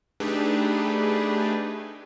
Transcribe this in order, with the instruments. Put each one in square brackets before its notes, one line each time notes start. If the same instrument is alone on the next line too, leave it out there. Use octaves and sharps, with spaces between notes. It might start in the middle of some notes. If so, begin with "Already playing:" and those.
[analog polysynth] A3 D4 D#4 G4 G#4 B4